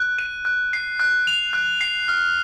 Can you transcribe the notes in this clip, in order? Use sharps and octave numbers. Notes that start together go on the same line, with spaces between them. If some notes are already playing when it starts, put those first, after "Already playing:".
Already playing: F#6
D#7
F#6
C7
F#6
F7
F#6
C7
F6